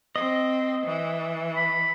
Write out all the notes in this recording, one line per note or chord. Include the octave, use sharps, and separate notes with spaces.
C4 D#5
E3
B5